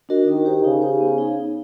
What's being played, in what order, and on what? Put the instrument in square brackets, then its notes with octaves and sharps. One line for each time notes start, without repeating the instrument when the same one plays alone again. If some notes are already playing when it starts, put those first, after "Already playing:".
[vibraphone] D4 F#4 A#4 D#5
[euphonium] D#3 [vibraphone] D#4
[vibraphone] G4 C5
[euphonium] C#3 [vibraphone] D#4
[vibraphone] G4 C5
B3
D#4 G#4
B3